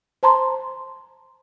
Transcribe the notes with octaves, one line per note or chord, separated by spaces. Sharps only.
C5 A5 A#5 C6